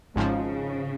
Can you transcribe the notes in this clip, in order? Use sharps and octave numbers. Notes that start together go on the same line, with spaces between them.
G#1 G#2 C#3 F3